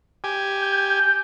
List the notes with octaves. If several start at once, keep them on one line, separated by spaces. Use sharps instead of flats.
G4 G#5
G6